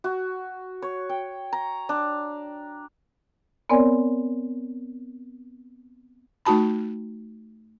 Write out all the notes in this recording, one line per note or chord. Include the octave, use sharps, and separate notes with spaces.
F#4
C#5
G5
A#5
D4
B3 C4 A#4 C#5 D5 G#5
A3 D#4 F#4 A5 B5